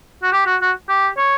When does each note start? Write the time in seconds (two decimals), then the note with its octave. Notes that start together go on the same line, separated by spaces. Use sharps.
0.23 F#4
0.32 G4
0.46 F#4
0.61 F#4
0.89 G4
1.17 C#5